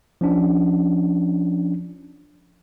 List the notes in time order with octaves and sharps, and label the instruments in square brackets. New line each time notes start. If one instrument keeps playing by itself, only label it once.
[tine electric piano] F3 C#4 D4